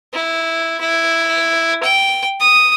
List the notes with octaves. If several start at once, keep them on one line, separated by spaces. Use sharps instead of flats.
E4
E4
G5
D#6